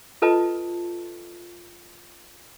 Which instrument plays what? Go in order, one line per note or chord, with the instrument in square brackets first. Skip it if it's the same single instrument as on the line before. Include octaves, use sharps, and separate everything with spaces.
[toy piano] F4 A4 B4 D#5 A5